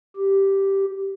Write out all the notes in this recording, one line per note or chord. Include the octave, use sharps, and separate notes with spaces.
G4